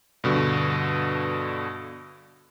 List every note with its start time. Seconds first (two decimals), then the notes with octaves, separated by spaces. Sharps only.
0.24 G2 B2 D3